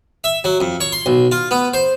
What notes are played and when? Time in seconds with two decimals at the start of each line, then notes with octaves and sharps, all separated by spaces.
0.24 E5
0.44 F#3
0.60 F2
0.81 C#5
0.92 C6
1.06 B1
1.32 F4
1.51 B3
1.74 C5